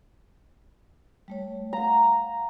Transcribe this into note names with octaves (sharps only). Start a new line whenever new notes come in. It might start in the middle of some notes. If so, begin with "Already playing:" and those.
G3 A3 C#5
F5 F#5 A#5